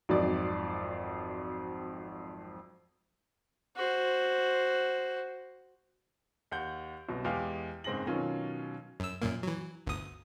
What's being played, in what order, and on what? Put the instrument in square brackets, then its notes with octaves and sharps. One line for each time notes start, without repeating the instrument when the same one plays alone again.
[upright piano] G#1 F2 F#3 D5
[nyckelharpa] F#4 C5
[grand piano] D#2 F#5 G6
C2 F#2 B2
E2 G#3 G4 F5 F6
F#1 G#2 C4 G#4 A#6 F#7
B2 D#3 F#3 C#4 F4
[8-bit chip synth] F#2 E6
F#2 A#2 A#3
E3 F#3
G1 D2 D#6